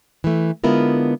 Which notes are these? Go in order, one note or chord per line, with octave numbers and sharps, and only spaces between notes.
E3 A3
D3 G#3 B3 E4 F4 A#4